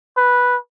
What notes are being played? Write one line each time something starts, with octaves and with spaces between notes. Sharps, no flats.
B4